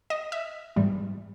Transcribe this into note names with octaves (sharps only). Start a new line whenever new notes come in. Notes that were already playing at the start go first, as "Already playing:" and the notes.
D#5
E5
G#2 E3 G3